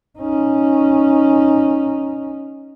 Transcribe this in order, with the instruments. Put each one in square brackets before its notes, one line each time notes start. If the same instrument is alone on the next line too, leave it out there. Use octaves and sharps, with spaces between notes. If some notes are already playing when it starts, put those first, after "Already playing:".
[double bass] C#4 D#4